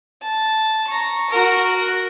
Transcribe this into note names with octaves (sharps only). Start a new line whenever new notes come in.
A5
A#5 C#6
F#4 A#4